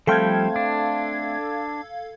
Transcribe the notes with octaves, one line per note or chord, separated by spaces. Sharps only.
F3 G3 A3 C4 A4 F5 G5 G#6
D4